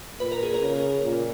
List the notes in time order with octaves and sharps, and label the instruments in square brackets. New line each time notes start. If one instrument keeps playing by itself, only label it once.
[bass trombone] A#2 [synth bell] B4
[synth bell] A#4
G#4
A#4
[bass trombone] C#3
A#2